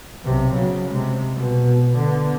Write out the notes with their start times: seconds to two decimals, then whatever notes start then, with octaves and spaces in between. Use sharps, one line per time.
0.24 B1 C3
0.54 C#3 F#3
0.90 C3 G#3
1.36 B2
1.97 D3 B3